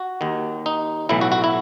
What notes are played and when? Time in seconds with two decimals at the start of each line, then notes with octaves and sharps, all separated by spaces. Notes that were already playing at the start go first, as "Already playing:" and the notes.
Already playing: F#4
0.21 D#2 D#3
0.66 D#4
1.09 B1 A2 E3 E4
1.21 F#4
1.32 F#4
1.44 E4